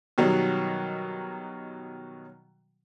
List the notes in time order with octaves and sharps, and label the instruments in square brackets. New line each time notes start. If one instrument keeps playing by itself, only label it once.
[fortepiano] B2 D#3 F#3 G3